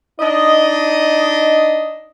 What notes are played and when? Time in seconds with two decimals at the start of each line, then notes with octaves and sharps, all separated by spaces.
0.19 D4 D#4 D#5